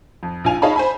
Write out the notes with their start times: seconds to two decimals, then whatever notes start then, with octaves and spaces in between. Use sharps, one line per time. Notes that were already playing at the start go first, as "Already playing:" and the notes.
0.23 F2
0.44 A#1 F4 G#5 F7
0.62 D#4 G#4 C#5 F5 A5 B5
0.76 C5 G#5 B5